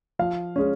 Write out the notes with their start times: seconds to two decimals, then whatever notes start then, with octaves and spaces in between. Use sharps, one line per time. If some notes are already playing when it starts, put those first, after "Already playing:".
0.19 F3 F5
0.56 G#3 C#4